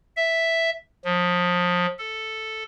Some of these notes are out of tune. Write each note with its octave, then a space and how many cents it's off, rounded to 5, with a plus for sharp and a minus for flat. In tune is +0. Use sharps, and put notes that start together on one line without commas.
E5 +0
F3 +30
A4 +0